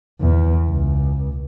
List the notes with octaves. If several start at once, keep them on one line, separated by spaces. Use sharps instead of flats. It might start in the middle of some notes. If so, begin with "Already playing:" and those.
E2
C#2